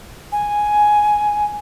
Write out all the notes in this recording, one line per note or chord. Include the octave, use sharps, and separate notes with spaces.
G#5